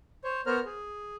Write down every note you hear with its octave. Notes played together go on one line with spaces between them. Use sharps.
C5 C#5
B3 A#4 C5 C#5 A#5 F6
G#4